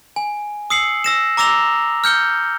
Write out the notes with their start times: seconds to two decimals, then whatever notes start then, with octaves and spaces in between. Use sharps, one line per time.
0.16 G#5
0.70 D#6 E6 C7 C#7 F#7
1.04 E6 A#6 E7
1.37 A#5 D6 E6 A#6 F7 G7
2.04 F6 G6 C#7 G7